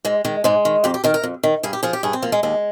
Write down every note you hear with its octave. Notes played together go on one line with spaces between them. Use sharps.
G#2 G#3
D#3 G#3
G#2 G#3
D#3
F2 G4
G4
D#3 A#4
A#4
F2
D#3
G2 G#4
G4
F3 G#4
G4
G2 G#4
C4
F3 A#3
G#3
D#2 G#3